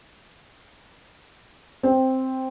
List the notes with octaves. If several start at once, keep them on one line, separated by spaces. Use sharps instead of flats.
C4